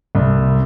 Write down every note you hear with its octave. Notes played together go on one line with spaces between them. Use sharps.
C2